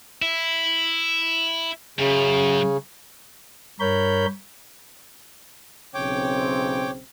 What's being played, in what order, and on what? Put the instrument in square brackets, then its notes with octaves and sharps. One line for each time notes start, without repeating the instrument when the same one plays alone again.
[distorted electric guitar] E4
[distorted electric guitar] F#2 [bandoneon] C#3
[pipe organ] G2 A#4 C#5 B5 G6
[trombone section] B1 C#3 C4 [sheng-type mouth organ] C#5 G5 D6